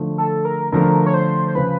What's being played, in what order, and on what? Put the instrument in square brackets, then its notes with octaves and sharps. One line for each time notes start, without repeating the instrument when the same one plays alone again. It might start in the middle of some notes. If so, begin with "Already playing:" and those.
Already playing: [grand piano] D3 F3 A3
[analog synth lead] A4
A#4
[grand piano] D3 F3 A3 [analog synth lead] A#4
[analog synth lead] C#5
C5
C5
[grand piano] C#3 F3 [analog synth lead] B4